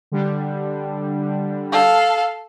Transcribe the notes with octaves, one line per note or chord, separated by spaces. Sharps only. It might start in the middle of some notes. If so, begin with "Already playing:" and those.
D3 G3 D4
A4 F5